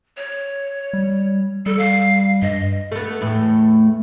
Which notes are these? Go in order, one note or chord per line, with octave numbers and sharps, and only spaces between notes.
C#5
G3
G3 A4
F5
G2 D#5
A3 B3
E2 A2